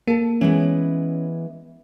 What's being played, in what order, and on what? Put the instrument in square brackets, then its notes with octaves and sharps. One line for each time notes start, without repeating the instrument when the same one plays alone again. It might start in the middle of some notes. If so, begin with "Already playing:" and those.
[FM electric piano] A#3 [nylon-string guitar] A4 A5
[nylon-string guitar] E3 G#3 B3 [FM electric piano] C#4